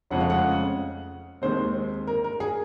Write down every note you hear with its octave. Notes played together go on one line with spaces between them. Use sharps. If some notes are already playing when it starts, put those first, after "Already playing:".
F1 F2 C#3 G#3 C#4 F#5
F5
F#5
D#2 D#3 G#3 C4 C5
A#4
A#4
G#4